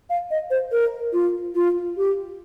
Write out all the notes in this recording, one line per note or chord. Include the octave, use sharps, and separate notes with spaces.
F5
D#5
C5
A#4
F4
F4
G4